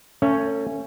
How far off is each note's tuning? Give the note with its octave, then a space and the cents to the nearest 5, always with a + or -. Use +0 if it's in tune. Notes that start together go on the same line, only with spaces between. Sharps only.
A3 +35 C#4 +0 C#5 +0